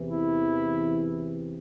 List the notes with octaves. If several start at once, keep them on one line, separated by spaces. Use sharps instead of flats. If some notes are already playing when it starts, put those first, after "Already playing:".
Already playing: E2 C3 E3
E4